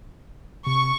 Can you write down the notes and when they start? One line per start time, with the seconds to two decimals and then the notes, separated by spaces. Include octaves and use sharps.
0.67 C3 C#6